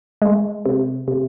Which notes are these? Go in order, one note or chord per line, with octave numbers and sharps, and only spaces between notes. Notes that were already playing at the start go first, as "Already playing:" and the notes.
G#3
C3
C3